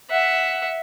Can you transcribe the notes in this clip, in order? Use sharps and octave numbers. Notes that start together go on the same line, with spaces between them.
E5 F#5